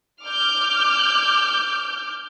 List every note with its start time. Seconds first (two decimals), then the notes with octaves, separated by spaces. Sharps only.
0.22 D6 F6 G6